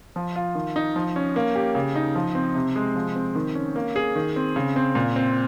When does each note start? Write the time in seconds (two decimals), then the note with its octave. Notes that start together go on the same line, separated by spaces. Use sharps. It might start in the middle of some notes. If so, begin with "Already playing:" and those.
0.16 F3
0.36 F4
0.55 D#3
0.76 D#4
0.96 F3
1.16 C#4
1.36 A#3
1.56 G4
1.75 C#3
1.96 D#4
2.15 F3
2.35 C4
2.55 C3
2.76 G#3
2.95 F3
3.16 C4
3.35 D#3
3.55 C#4
3.76 A#3
3.96 G#4
4.16 D#3
4.36 C4
4.56 C#3
4.76 C4
4.95 A#2
5.16 C4